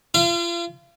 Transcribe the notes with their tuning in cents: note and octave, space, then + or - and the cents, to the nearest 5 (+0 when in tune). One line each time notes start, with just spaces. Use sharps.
F4 -35 F5 -40